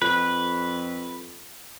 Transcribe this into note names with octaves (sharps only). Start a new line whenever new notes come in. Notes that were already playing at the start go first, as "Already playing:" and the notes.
F2 B4